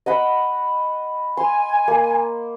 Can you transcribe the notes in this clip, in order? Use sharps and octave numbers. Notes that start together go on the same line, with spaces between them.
D#5 F#5 B5
G#5 C6
A#3